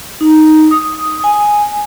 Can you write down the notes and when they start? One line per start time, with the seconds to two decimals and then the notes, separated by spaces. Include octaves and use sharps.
0.21 D#4
0.71 D#6
1.24 G#5